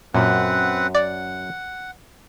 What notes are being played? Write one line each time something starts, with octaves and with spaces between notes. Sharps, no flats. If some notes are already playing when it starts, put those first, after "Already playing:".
F#2 A#2 C4 B4 F#5
D5 F#5